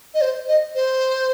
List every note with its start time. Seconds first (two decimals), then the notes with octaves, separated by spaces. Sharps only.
0.14 D#5
0.21 C5
0.48 D#5
0.75 C5